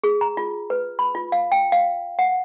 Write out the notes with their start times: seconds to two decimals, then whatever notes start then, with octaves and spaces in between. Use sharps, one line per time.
0.04 G#4
0.21 A#5
0.37 F4
0.70 B4
0.99 B5
1.15 F4
1.32 F5
1.52 G5
1.72 F5
2.19 F#5